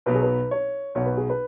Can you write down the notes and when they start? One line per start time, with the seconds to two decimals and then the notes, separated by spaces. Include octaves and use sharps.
0.06 B1 B2 F#3 B3 B4
0.15 G#4
0.23 B4
0.51 C#5
0.95 B1 B2 B3 F#4 C#5
1.06 B4
1.17 G#4
1.30 B4